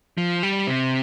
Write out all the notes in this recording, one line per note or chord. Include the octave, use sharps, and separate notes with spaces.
F3
G3
C3